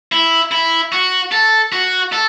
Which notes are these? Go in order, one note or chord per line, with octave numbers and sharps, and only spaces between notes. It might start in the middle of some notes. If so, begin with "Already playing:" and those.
E4
E4
F#4
A4
F#4
A4